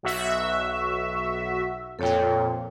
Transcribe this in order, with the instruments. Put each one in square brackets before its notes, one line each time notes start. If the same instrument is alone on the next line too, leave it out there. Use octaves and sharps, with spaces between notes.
[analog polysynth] B1 F#4 E5
[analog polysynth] F2 A#2 [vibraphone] A4 C#5 G5